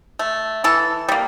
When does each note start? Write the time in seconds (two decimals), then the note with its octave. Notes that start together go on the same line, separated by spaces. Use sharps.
0.19 A3
0.64 E3 A4
1.09 G3 A#3